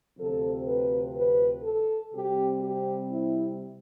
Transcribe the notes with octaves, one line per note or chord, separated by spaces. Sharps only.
D2 C3 F3 C4 A4
B4
B4
A4
C3 G3 C4 G4
G4
E4